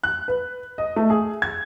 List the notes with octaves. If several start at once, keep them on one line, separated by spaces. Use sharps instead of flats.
F#6
B4
D#5
A3
G#4
G#6